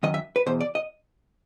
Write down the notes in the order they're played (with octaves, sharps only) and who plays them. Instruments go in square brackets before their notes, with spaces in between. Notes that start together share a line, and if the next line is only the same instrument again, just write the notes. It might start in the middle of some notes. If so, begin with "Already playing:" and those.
[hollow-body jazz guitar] F#2 D#3 D#5
E5
B4
E2 B2 C5
D5
D#5